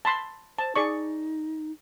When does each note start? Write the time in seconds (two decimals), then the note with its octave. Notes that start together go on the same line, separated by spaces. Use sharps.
0.05 A5 B5 C6
0.59 C5 A5
0.76 D#4 G#4 D5 C#6